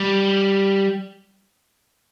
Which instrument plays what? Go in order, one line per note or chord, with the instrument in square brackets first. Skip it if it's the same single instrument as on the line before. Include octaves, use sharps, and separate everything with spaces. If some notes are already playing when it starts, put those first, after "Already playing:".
Already playing: [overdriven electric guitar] G3